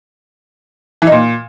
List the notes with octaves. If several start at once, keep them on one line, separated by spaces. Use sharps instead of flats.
E3
D#4
A#2